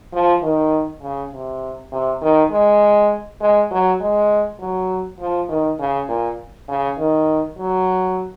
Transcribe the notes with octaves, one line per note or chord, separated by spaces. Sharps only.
F3
D#3
C#3
C3
C3
D#3
G#3
G#3
F#3
G#3
F#3
F3
D#3
C#3
A#2
C#3
D#3
F#3